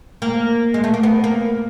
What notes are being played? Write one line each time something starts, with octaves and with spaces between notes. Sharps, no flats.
A#3
G#3
A3
A#3
B3
A#3